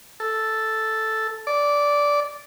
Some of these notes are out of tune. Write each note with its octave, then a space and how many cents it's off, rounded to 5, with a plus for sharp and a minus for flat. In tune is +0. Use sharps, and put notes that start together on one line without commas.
A4 +0
D5 -10